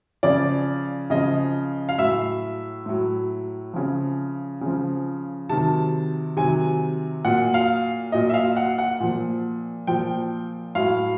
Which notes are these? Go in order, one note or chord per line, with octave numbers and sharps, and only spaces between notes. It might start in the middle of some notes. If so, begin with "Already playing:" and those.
C#3 F3 D5
C#3 F3 D#5
F5
A2 F#3 E5
A2 F#3
C#3 F3
C#3 F3
C3 D#3 F#3 A5
C3 D#3 F#3 G#5
A#2 F#3 F#5
F5
A#2 F#3 D#5
E5
F5
F#5
F#5
A#2 F3
A#2 F3 G5
A2 F#3 F5